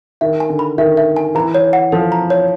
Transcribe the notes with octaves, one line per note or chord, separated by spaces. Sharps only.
D#3 E5
G#5
D3
B5
D#3 E5
E5
G#5
E3 A#5
C#5
F#5
F3 A4
A#5
C#5